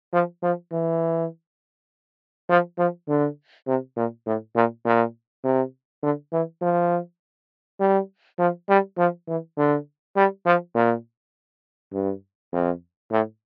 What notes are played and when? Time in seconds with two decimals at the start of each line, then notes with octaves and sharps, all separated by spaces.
0.13 F3
0.43 F3
0.72 E3
2.49 F3
2.78 F3
3.08 D3
3.67 C3
3.96 A#2
4.26 A2
4.56 A#2
4.85 A#2
5.44 C3
6.03 D3
6.33 E3
6.62 F3
7.80 G3
8.39 F3
8.69 G3
8.98 F3
9.28 E3
9.57 D3
10.16 G3
10.46 F3
10.75 A#2
11.93 G2
12.53 F2
13.11 A2